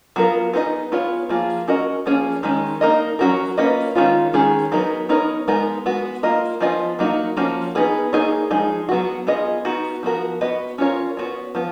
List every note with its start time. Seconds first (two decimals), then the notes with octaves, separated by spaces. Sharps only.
0.16 F#3 B3 F4 A#4
0.53 B3 D#4 G#4 B4 D#5
0.92 B3 F4 G#4 C#5
1.29 F3 A#3 F4 G#4
1.68 C#4 F#4 A#4 D#5
2.06 F3 A#3 C#4 G#4
2.43 D#3 G#3 C#4
2.81 A#3 D#4 A#4 D#5
3.19 F#3 C#4 F#4 A#4
3.57 A#3 C#4 F4 B4 D#5
3.95 D#3 G#3 C#4 F4
4.33 D#3 G#3 C#4 G#4
4.72 F#3 B3 D#4 A#4
5.09 B3 D#4 A#4 C#5
5.48 G#3 B3 D#4 A#4
5.86 G#3 B3 F#4
6.23 A#3 F4 A#4 D#5
6.60 F3 B3 F4 G#4 D#5
6.99 F#3 A#3 D#4 F#4
7.37 F3 A#3 C#4 F#4
7.75 B3 D#4 G#4 B4
8.13 A#3 D#4 G#4 C#5
8.51 F3 G#3 D#4 G#4
8.89 F#3 B3 F#4
9.27 B3 F4 G#4 D#5
9.65 B3 D#4 F#4
10.03 F3 B3 F#4 A#4
10.41 B3 F#4 B4 D#5
10.78 C#4 F4 A#4 C#5
11.17 B3 F#4 C#5
11.55 F3 B3